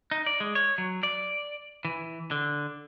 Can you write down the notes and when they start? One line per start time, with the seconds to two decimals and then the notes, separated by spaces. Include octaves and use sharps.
0.11 D#4
0.26 D5
0.40 G#3
0.55 C#5
0.78 F#3
1.03 D5
1.85 E3
2.31 D3